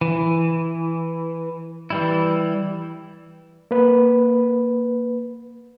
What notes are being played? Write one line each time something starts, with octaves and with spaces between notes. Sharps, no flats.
E3
E3 G3 E4
A#3 B4